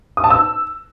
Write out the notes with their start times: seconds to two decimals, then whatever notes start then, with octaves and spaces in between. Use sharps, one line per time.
0.17 D#6
0.24 A5
0.30 E6